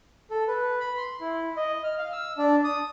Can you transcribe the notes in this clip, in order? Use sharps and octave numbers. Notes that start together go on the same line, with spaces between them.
A4
B4
B5
C6
E4
D#5
F6
F5
E6
D4
D#6